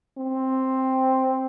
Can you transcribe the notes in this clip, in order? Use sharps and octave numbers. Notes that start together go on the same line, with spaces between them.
C4